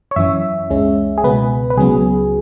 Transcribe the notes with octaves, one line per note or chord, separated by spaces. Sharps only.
C#5
F#2 E3 C#4 E5
C#2 C#3 G#3 C#4
G#4
C#2 B2 B3 B4
B4
C#2 C#3 F#3 B3 G#4